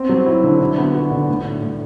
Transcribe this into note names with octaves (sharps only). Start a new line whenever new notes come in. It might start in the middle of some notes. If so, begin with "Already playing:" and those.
Already playing: B3 C4
F#3
E4
D3
D3
B3
F#4
D3
A2
D4
A2